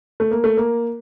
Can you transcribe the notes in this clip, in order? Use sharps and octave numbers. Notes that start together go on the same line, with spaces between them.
A3
A#3
A3
A#3